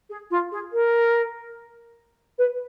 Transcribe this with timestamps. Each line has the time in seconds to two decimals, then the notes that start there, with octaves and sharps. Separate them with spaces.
0.09 G#4
0.30 F4
0.51 G#4
0.72 A#4
2.38 B4